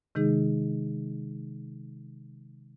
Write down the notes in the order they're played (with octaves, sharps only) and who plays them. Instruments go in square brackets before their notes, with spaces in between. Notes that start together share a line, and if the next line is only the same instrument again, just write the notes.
[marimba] C3 D#3 G#3 D#4 G#4